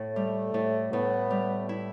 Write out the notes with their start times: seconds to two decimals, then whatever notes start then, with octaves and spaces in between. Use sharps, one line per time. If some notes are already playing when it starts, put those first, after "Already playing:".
Already playing: A2
0.15 G3 A3
0.54 A2
0.93 A2 B3
1.30 G3
1.69 E4